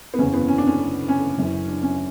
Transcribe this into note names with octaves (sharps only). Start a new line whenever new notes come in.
B3
F#1 E2 C#3 E3 C#4
B3
C#4
D4
C#4
C#4
F#1 F#2 E3
D4
C#4